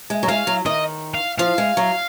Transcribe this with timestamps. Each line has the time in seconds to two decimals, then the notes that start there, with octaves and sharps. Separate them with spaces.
0.10 G#3
0.23 F#3
0.29 G#3 F5
0.47 F#3
0.66 D#3 D#5
1.14 F5
1.39 F3 F5
1.58 G#3
1.77 F#3